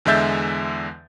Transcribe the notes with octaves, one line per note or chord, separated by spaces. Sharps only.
E2 D3 G#3 E5 G6 A6